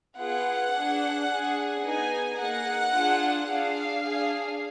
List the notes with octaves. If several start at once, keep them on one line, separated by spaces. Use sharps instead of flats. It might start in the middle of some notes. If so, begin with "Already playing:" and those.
B3 F4 G#4 F#5
D4 G#4
D4 G#4
B3 D#4 G#4 G#5
A#3 D#4 G#4 F#5
D4 F4 G#4
D4 G#4 F5
D4 G#4